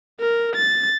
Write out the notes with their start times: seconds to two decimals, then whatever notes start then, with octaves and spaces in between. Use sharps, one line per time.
0.20 A#4
0.56 A6